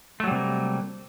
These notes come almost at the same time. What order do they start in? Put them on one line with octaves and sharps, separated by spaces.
A3 F#3 G3 C3 A#3